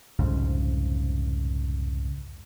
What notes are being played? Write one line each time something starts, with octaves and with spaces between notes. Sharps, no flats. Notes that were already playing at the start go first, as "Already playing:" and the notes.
C2 F2 G#2 C#3